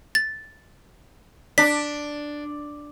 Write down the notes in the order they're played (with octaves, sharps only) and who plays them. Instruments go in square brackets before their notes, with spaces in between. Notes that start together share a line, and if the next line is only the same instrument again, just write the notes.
[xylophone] A6
[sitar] D4 [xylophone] B6